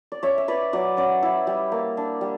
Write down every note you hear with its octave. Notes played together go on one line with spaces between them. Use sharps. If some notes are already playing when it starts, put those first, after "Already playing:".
D5
C#4 C#5 E5
E5
E4 B4 D5
F#3 D5 F#5
C#4 D5 F#5
E4
G3
A#3
D4
G3